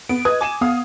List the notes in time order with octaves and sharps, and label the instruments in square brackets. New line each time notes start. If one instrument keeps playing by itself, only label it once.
[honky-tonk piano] B3 [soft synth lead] D7
[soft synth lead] B4 [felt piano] D#5 D#6 [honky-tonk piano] G#6
[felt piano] G#5 D#7 E7 [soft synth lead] D6
[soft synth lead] B3 [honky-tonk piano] F5 D#6